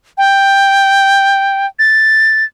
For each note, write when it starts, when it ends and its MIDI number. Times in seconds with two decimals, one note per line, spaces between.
0.18 1.66 79
1.79 2.44 93